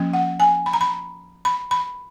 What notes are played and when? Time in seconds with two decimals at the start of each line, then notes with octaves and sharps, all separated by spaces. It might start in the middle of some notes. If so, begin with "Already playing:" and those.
Already playing: F3 A#3 C#4
0.13 F#5
0.40 G#5
0.66 B5
0.74 A#5
0.81 B5
1.45 B5
1.71 B5